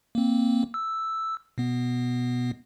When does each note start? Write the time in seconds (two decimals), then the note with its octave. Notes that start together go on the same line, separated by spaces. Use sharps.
0.15 A#3 C4
0.74 E6
1.58 B2 B3